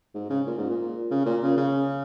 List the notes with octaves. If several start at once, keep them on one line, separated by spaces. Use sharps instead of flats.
G#2
C#3
A#2
G#2
A#2
C#3
A#2
C#3
C#3